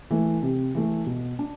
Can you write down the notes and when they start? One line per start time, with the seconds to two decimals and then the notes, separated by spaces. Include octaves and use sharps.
0.11 E3 A3
0.42 C3
0.75 E3 A3
1.06 B2
1.39 D4